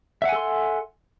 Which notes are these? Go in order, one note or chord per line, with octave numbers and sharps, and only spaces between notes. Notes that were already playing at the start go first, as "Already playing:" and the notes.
A4 E5 F#5 G#5 C6